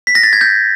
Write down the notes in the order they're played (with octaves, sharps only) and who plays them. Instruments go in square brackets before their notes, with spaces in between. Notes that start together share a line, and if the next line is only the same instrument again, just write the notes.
[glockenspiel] B6
A#6
A6
G#6
G6